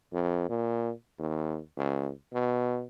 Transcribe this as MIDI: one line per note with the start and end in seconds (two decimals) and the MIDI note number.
0.13 0.45 41
0.49 0.91 46
1.19 1.59 39
1.77 2.11 37
2.34 2.85 47